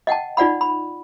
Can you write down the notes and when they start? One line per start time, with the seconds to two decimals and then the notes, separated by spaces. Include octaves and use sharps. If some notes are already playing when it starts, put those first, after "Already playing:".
0.07 D#5 F#5 G5 A5
0.37 D#4 F4 D5 F#5 B5
0.61 B5